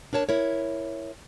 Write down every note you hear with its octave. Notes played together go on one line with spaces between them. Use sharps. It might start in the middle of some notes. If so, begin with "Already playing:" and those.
D4 A#4 C#5 A5
E4 A#4 C#5